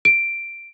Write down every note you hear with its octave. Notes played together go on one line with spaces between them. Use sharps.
D7